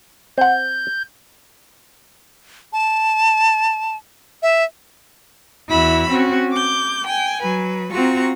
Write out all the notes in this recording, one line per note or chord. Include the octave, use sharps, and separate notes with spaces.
C4 F#5 G6
A5
E5
E2 E4 F#4 B5 E6
C4 C#4 F#4
D6 G6
G5 G#5
F#3 B4
C4 F4 F#4 A#5 C#6